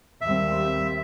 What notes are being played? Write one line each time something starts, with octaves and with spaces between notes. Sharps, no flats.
D#2 G3 C4 E5